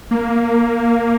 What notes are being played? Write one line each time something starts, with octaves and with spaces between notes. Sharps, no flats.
A#3